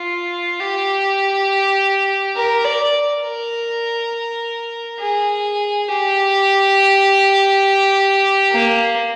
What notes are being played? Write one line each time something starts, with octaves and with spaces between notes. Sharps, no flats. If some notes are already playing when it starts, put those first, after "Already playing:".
Already playing: F4
G4
A#4
D5
A#4
G#4
G4
A#3